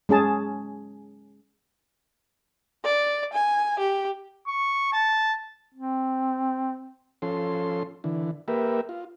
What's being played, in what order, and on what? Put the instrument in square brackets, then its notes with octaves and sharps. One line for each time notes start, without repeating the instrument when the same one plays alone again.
[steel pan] G#3 C#4 G#4 A5
[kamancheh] D5
G#5
G4
[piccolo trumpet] C#6
A5
[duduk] C4
[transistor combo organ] F3 C#4 A4 C6
D3 E3
A#3 G4 A#4 B4 E5
F4